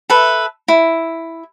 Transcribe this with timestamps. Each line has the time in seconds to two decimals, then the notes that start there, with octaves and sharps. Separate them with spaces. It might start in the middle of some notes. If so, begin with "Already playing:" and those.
0.10 A4 B4 E5
0.68 E4